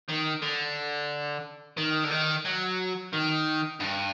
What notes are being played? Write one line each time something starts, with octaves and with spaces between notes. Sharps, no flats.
D#3
D3
D#3
D3
D#3
F#3
D#3
G2